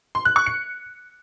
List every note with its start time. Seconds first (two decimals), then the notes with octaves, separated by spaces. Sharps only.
0.15 C6
0.25 F#6
0.36 C#6
0.46 C#7